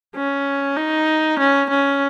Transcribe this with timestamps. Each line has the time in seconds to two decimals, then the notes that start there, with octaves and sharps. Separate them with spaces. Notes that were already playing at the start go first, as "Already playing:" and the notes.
0.16 C#4
0.77 D#4
1.39 C#4
1.70 C#4